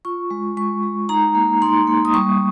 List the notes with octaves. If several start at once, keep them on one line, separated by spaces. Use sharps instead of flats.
F4 C#6
G#3
G#3 C#6
G#3
D#4 A#5
A#3
D#4 C6
A#3
D#6
G3 C#6